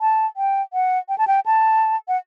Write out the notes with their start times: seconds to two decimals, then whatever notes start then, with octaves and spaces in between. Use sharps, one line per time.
0.01 A5
0.37 G5
0.73 F#5
1.09 G5
1.18 A5
1.27 G5
1.46 A5
2.08 F#5